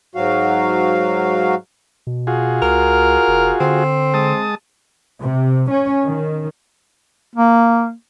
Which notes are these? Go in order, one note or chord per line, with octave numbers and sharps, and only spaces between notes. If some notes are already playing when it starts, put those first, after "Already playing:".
G#2 F#3 F#4 F5
B2
F4 F#4 G#4
C#2 A#4
F1
D3 C4
G#3 A5 D#6
C3
C#4
D#3
A#3